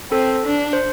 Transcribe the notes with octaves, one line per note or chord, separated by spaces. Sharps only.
C4 A4
D4
C5